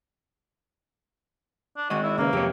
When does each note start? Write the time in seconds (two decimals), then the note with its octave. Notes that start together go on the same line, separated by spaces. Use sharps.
1.77 D4
1.90 D#3 G#3 F#4 D#5
2.03 E4
2.18 C#3 A#3 C#4 B4
2.33 F2 C3 G4 C#5